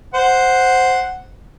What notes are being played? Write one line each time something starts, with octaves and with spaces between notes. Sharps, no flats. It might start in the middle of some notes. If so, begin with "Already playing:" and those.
C5 F#5